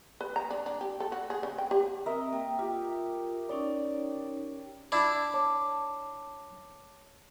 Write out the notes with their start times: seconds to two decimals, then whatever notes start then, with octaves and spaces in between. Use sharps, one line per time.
0.21 B4
0.36 A#5
0.50 D4
0.66 D4
0.81 G4
1.00 A4
1.12 F#4
1.30 G#4
1.43 C#3
1.58 G5
1.71 G4
2.06 C4 A#4 D#5 E5
2.33 A#3 G5 A#5
2.59 F4 G4
3.49 C#4 D#4 C#5 D5
4.92 D4 E4 D6
5.34 C#5 A5 D6